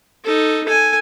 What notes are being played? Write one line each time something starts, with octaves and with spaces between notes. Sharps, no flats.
D#4 A4
A4 G#5